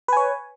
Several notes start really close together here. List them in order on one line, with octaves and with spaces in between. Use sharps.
B4 G#5 C#5